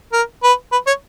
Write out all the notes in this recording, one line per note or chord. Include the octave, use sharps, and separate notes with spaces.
A#4
B4
B4
C#5